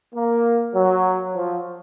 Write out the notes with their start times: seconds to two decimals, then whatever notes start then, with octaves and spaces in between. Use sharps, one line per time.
0.14 A#3
0.75 F#3
1.36 F3